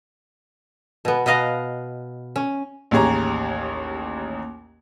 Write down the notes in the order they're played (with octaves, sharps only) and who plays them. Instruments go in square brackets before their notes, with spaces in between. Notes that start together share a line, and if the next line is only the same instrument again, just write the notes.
[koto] B2 B3
B2 B4 D#5 F5 A#5
C#4
[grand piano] A1 D#2 G4 G#4 C#5 A#5